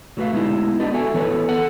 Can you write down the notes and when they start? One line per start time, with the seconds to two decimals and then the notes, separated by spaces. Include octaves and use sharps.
0.17 F#3 A3 F#4 B4 E5 F5
0.33 G#3 B3 D#4 E4 G4
0.80 B3 D4 G4 B4 D5 D#5
0.94 F#4 A4 E5 G#5
1.14 E3 B3 A4 B4 C#5
1.49 A4 F#5